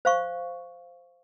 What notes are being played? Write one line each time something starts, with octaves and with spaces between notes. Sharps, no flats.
C5 F5 C#6